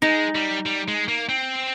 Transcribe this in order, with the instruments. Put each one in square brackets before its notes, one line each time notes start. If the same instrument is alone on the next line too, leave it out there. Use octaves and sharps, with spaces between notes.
[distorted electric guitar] G#3 [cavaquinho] D#4
[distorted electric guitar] G3
G3
G#3
A#3
C4